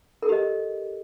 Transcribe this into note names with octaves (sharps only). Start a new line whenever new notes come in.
G4 A4 A#4 D#5